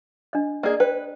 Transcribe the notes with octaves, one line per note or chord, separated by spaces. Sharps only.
D4 D#5
A#3 G#4 D5 D#5
B4 C5 G5